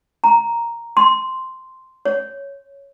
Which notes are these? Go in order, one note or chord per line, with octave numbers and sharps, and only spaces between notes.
A#5
C6
C#5